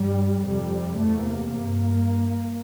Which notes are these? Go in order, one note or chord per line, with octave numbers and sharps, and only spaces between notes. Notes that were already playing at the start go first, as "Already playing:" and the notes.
Already playing: G2 G3
F2 C3 G3
E2 C3 A3
A#3
G2